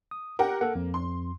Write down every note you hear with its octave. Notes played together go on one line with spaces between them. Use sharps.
D#6
G4 A#4 F#5 G5
A#3 A4 F#5
F2
C6